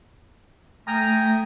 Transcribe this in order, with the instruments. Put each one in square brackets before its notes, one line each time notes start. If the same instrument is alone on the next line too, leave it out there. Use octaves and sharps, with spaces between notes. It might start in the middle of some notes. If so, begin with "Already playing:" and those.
[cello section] A3 [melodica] G5 G#5 D#6 [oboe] A#5